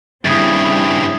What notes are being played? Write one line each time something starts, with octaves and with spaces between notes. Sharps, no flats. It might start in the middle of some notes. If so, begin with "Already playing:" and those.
G2 C#3 G3 C4 E4 D#6 G#6 A6